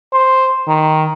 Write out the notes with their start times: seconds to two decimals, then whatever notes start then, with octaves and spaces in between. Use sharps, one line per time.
0.13 C5
0.68 D#3